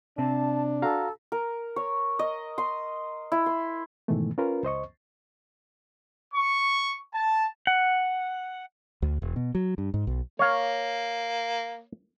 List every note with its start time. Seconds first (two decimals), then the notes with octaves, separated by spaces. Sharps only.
0.18 C3 C4 D4 A5
0.82 F#4 A4 F5 A#5
1.32 A#4
1.76 C#5
2.19 D#5
2.58 C6
3.32 E4
3.46 C6
4.08 G#2 B2 D#3 E3 A3
4.38 C#4 F4 A#4 B4
4.63 C#2 C5 D#5 C#6
6.34 C#6
7.14 A5
7.67 F#5
9.02 D2
9.22 E1
9.36 B2
9.55 F#3
9.78 G2
9.94 G#2
10.07 B1
10.39 A#3 C#5 F5